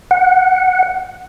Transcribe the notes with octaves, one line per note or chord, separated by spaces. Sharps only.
F#5